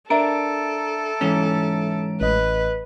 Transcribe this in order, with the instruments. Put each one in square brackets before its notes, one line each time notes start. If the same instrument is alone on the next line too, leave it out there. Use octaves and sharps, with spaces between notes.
[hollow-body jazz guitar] D4 A#4 [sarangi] A4 [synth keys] E5 A#5 D7
[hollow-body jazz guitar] G#2 E3 C#4
[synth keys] A1 D#5 [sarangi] B4